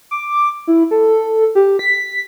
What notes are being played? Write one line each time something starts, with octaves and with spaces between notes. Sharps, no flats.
D6
E4
A4
G4
B6